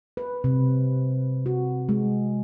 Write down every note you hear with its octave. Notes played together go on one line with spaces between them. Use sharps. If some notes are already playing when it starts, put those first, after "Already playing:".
B4
C3
F#4
G#3